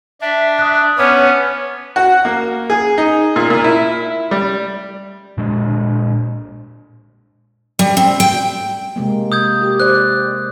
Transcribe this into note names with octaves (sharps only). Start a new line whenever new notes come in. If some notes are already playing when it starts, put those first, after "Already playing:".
D4 E5
D#6 F#6
B3 C#4 C#5 D6 F6
F#4
A#3
G#4
D#4
A#2
A#2
E4
G3
A#2 G#3 D4
G3
C4
G5
C3 G#3 A#3
D#6 G6 G#6
G4
C5 D5 F#6